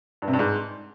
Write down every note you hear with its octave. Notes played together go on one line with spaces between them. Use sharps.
G2
C3
G2
G#2